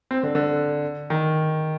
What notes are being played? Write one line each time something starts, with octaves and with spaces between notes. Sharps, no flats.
C4
D3
D3
D#3